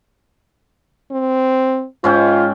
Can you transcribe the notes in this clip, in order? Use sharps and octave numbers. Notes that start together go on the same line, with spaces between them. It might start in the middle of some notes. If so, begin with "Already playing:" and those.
C4
G#2 C#4 F4 G5